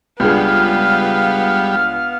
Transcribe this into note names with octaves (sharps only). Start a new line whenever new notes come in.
C#2 G3 B3 D4 G#4 F5 F6